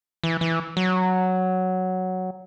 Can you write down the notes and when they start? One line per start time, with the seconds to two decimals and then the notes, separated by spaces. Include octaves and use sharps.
0.23 E3
0.41 E3
0.77 F#3